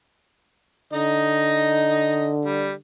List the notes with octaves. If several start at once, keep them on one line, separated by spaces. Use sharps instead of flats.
D3 D#4 D#5
G3